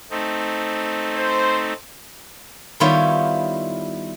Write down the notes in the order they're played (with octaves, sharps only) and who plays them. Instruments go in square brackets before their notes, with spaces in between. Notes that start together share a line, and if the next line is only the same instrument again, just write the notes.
[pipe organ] A3 C4 D#4
[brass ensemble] C5
[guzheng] D#3 G3 B3 E4 F4 C#5